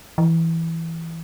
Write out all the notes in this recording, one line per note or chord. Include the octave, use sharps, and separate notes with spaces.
E3